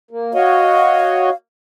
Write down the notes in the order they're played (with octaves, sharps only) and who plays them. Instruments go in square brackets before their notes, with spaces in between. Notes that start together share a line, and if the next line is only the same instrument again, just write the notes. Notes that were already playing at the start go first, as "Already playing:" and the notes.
[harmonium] A#3
[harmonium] F#4 C#5 D#5 [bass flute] F5